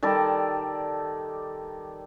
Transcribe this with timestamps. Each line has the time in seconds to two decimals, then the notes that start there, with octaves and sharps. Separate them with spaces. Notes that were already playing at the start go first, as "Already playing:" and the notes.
0.03 D#3 G3 A4 D5